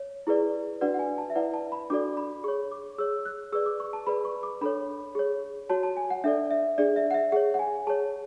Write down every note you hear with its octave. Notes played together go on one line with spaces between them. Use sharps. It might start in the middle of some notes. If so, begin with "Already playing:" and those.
Already playing: C#5
E4 G#4 B4 D5
D4 F#4 B4 D5 F#5
F#5
G#5
A5
E5
E4 B4 D5 F#5
A5
B5
D4 F#4 A4 D5 D6
B5
G#4 C#5 C#6
D6
G#4 C#5 E6
F#6
G#4 B4 D5 E6
D6
C#6
A5
G#4 B4 D5 B5
C#6
D6
D4 A4 C#5 B5
G#4 C#5
F#4 C#5 A5
A5
G#5
F#5
D4 A4 D5 E5
E5
D4 G#4 D5
E5
F#5
E5
G#4 C#5 F#5
F#5
G#5
G#4 C#5 A5